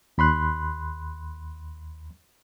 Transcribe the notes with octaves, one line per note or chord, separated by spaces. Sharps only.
D#2 B5 C6 F#6